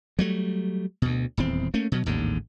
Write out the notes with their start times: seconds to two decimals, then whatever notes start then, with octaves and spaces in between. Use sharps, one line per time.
0.19 F#3 G3 A3
1.02 D2 B2
1.37 D#1 E2 C4
1.74 A3 A#3 C#4
1.92 B2 F#3
2.06 A1 D#2 G#2 D3